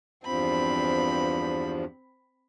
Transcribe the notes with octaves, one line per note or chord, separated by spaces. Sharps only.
E2 G2 F3 C4 B5